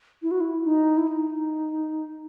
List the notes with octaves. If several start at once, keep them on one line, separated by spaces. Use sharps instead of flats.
E4
F#4
E4
D#4
E4
D#4